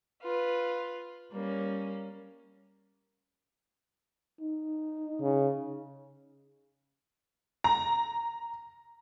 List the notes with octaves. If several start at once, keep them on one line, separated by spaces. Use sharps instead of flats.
F4 B4
G3 A#3 C#4
D#4
C#3
A#5